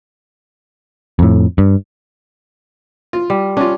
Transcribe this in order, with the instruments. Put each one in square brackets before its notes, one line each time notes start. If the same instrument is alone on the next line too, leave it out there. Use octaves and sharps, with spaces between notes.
[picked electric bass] F2 A2
G2
[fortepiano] F4
[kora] G3
[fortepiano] C#4 F4 [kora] D4